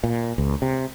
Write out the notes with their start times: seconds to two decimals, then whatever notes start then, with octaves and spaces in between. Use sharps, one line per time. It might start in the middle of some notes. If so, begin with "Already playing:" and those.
0.04 A#2
0.38 C#2
0.62 C3